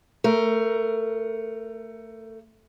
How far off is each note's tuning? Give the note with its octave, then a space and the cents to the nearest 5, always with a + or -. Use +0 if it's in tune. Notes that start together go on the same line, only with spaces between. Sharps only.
A3 +20 A#4 +0